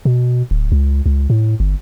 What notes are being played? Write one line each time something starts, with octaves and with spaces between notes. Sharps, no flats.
B2
D1
C#2
C#2
A2
G1